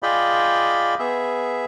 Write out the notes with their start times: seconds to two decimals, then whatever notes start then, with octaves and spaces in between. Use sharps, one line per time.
0.03 F4 G#4 D5 D#5 G5 B5
0.99 B3 G#4 E5